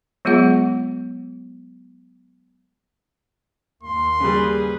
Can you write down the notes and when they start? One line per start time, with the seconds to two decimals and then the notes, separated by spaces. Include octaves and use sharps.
0.25 F#3 G#3 B3 F4 G#4 F#5
3.83 D#2 A#3 C6
4.20 C#3 G3 G#4 B4